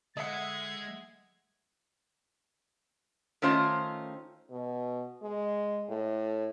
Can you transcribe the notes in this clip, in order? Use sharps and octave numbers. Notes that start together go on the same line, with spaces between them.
D3 G#3 D#5 E5 F#5 G#6 C7 C#7
D#3 A3 C#4 F4 C5
B2
G#3
A2